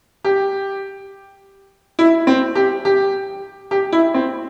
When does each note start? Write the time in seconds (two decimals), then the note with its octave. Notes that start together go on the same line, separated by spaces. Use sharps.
0.25 G4
1.99 E4
2.27 C4
2.55 G4
2.85 G4
3.71 G4
3.92 E4
4.14 C4